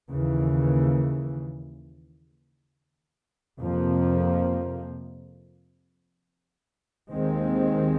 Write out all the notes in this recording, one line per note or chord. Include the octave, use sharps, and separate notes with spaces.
D#2 C#3 E3
F2 C3 F3 A#3
D#2 D#3 G#3 C4